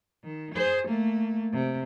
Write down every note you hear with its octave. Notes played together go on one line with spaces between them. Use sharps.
D#3
G#4 C5
A3 A#3
C3